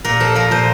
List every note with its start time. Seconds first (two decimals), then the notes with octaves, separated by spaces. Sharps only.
0.04 A#2 A#4
0.20 F3 A4
0.35 F3 A#4
0.51 A#2 C5